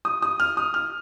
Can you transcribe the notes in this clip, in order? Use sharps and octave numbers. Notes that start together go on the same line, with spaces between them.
D#6
D#6
F6
D#6
F6